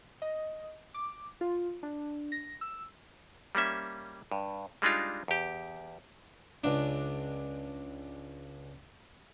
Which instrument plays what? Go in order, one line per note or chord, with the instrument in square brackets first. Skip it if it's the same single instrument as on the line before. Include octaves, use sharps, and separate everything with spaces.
[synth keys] D#5
D6
F4
D4
A#6
E6
[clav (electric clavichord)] G3 A#3 C#4 E5
G2
G3 G#3 D4 D#4 F4
E2 G4
[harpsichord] C#2 D4